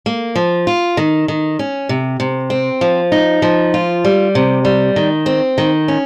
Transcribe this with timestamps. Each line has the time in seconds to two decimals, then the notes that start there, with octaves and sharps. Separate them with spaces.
0.06 A#3
0.35 F3
0.67 F4
0.97 D#3
1.28 D#3
1.59 C#4
1.89 C3
2.20 C3
2.50 C4
2.81 F3
3.12 D#4
3.42 F3
3.74 F4
4.05 G3
4.35 C3
4.65 G3
4.96 D#3
5.26 C4
5.58 D#3
5.88 C#4